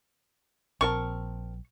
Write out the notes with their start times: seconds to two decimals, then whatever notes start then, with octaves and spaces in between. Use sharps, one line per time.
0.81 A#1 C4 A#4 A5 C#6